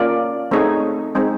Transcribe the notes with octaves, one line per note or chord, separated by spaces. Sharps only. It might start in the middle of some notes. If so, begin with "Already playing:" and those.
Already playing: A#3 C#4 F4 A#4 D5
A3 C4 D#4 G#4 C#5
G#3 C4 D#4